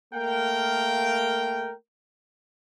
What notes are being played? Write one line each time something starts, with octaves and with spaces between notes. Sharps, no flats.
A3 A#3 A#4 F5 G5